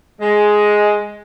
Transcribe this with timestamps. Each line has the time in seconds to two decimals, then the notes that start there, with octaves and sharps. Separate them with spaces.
0.20 G#3